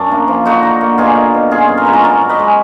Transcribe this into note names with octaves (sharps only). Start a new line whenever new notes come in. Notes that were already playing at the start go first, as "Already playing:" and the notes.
Already playing: F#2 D4
A#3
F3
D3 D#4 F#4
D3
A#3
B2 F4 G#4
A#3
B2
F#2 F4 G#4
F#2
A#4
G#3 B4
F#4 A#4
F#2 A#4 D5
F#2
B4 D#5
G#3